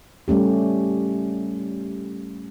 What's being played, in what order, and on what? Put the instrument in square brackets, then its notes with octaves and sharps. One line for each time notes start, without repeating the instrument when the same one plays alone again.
[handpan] G3 A3 C#4 G4